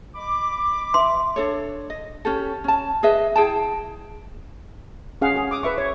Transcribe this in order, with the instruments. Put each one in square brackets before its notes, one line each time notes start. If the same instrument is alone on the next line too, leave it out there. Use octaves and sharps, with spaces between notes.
[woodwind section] D#5 B5 D6
[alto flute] E5 [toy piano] C6
[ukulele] D4 A4 C#5
D#5
C#4 G4 A4
C#4 A5
G#4 B4 D#5 E5
E4 G#4 G5 A5
[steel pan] C#4 G#4 F5 F#5
G#4
D6 D#6
B4 E5 C#6
C#5